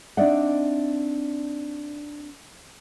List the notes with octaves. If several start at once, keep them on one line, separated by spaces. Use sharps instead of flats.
C4 D4 D#4 D5 E5 F#5